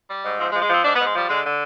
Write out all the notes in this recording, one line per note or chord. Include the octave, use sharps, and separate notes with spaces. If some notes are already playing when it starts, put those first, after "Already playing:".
G3
G#2
F3 C4
G#3
F3
G#3
F3 C4
G#2 D4
B3
G#2
G#3
F3 G3
D3 G#3
D3